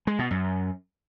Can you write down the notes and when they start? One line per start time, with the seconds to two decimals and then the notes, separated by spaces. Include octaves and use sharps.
0.07 G#3
0.19 B2
0.31 F#2